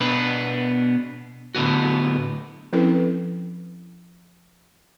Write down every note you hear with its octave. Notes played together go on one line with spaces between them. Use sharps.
B2 B3 D4 B4
D2 A2 D3 B3 F#4
F3 C4 C#4 E4 A4 B4